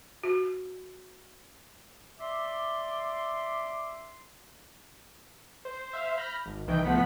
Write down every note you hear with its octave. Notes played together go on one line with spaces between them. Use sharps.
F#4
D5 E5 C6 D6
C5
C5 E5 F5
B5 F6 G6 A#6
G#1
C2 D#3 E3 G5 G6
C#2 A2 F3 B3 F#5 B6